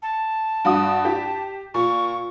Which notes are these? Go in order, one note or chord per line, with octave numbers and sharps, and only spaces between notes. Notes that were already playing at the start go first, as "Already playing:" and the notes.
A5
G2 F#4 D#6
G4
A#2 C#6